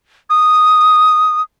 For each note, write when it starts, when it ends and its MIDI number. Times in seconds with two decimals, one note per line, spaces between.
0.30 1.42 87